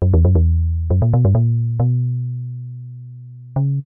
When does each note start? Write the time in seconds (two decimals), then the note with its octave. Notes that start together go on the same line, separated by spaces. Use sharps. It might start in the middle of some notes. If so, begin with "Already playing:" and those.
0.02 F#2
0.14 E2
0.25 F#2
0.35 E2
0.90 F#2
1.02 A#2
1.13 B2
1.25 G2
1.35 A#2
1.80 B2
3.56 C#3